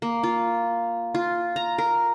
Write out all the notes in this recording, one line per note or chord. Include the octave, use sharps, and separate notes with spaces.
A#3
F4
F4
A#5
A#4